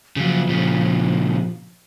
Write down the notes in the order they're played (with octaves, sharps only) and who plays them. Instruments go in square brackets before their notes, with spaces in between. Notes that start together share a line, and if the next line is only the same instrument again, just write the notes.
[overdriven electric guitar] C#3 F#3 [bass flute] F3
[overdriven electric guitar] A#2 C#3